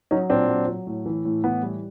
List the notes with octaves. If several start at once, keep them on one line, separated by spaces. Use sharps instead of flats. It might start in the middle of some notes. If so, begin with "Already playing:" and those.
F#3 C#4 D#4
A#2 C4 D4
F#3
F#3
A2
E3
A2
E3 B3
G3